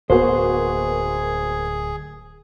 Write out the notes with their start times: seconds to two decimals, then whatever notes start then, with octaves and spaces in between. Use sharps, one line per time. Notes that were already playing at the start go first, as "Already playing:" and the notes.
0.10 D1 A#3 B3 F#4 G#4 C5